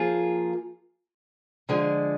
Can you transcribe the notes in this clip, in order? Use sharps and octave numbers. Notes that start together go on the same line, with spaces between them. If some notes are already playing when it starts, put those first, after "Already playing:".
Already playing: F3 A#3 F4 G#4
D3 F3 G#3